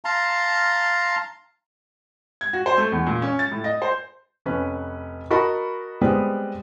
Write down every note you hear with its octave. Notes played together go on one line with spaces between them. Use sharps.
F5 A5 A#5 C6
G#6
F#4
C5
A3
E2
A#2
C#4
A6
A2
D#5
C5
F1 C#4 B4
F#4 A#4 D#5 A5 B5 C#6
G3 G#3 B3 C4 B4